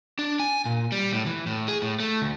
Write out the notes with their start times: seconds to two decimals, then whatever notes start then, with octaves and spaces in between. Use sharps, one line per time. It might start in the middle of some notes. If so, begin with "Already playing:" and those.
0.19 D4
0.40 G#5
0.65 A#2
0.92 G3
1.13 A2
1.26 E3
1.47 A2
1.68 G#4
1.82 A2
2.00 A3
2.22 D2